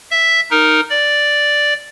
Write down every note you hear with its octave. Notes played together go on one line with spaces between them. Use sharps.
E5
D#4 A#4
D5